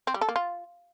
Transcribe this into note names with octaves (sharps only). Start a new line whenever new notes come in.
C4
G3
A4
A#3
F4